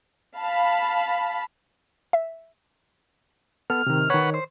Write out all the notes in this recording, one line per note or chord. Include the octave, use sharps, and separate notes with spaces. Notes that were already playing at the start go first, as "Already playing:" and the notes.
F5 A5 B5
E5
B3 A4 F6
C3 D#3
D#3 B4 C#5 F#5 C#6
C5